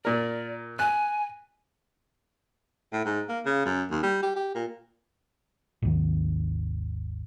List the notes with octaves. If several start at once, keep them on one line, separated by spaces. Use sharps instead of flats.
A#2 A#4 D5
G#5 F#6
A2
G#2
A#3
C#3
F#2
D#2
G3
G4
G4
A#2
G#1 D#2